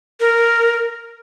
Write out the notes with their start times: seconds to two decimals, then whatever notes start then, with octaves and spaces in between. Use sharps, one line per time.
0.20 A#4